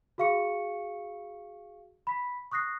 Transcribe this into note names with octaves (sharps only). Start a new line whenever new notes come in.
F#4 G#4 F5 C#6 C#7
B5 B6
C#6 D#6 F#6 A#6 C7